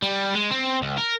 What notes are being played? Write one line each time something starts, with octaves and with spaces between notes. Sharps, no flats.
G3
G#3
C4
C#2
A#4